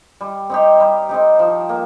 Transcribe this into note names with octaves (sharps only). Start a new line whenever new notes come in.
G3
C4 D#4 G4
G3
C4 D#4 G4
F3
A#3